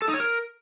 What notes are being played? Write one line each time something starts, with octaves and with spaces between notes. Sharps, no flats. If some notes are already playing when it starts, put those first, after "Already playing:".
A4
D#4
C#5
A#4